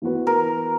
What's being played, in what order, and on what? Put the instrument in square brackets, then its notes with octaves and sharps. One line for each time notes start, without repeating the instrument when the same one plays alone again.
[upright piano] E3 B3 F#4 B4
[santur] A#4